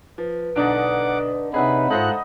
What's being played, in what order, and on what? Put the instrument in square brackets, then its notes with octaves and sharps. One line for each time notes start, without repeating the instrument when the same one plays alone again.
[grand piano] F3 [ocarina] B4
[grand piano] B1 D4 [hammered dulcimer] D3 D#4 [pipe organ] F#5 D6
[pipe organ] C3 D#4 B4 [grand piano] G#4 [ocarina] C#5 [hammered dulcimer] E5 F#5 B5
[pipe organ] G#2 F4 F#6 [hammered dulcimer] D#4 [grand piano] A4 C5 F#5